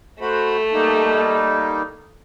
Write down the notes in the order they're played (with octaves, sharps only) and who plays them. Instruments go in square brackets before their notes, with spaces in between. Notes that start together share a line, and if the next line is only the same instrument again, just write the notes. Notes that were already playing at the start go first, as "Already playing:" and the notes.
[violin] A3 [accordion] F#4 C5 B5
[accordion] G3 A#3 D#4